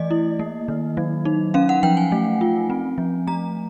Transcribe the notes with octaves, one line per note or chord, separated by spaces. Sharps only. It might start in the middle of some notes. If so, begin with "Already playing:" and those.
Already playing: E3 A3 D5 D#5
E4
A#3
D#3
F#3
D#4
C#4 F5
F#5
F3 G5
G#5
A3
F4
C4
F3
A3 A#5